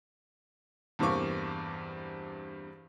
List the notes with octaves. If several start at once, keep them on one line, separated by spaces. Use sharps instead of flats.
E2 G2 C3 A#3 C#6 D6